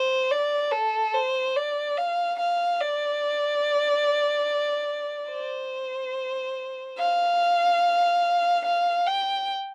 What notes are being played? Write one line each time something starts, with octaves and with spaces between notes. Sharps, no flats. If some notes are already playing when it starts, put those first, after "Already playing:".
Already playing: C5
D5
A4
C5
D5
F5
F5
D5
C5
F5
F5
G5